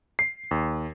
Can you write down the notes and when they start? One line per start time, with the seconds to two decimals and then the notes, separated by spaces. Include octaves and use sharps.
0.19 C7
0.51 D#2